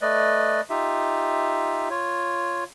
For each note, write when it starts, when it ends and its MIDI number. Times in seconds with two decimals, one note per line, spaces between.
0.01 0.61 57
0.01 0.61 71
0.01 0.61 74
0.01 0.61 75
0.70 1.89 63
0.70 1.89 65
0.70 1.89 67
0.70 1.89 76
1.90 2.64 65
1.90 2.64 73